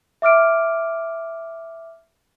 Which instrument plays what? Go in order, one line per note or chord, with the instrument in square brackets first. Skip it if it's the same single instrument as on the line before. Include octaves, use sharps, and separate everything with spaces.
[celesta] E5 D6 F6 D7